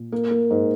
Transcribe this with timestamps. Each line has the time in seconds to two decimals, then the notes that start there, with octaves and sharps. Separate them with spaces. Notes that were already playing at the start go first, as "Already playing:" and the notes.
Already playing: A#2
0.12 A#3
0.31 A#3
0.50 G#2